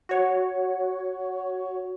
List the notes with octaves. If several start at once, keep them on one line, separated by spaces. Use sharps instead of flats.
F#4 C#5